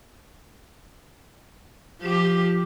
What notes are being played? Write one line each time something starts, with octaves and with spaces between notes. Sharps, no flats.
F3 G4